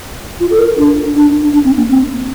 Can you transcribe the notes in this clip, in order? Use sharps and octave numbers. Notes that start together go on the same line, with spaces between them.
F4
A4
A#4
D4
D4
D4
C4
A#3
C4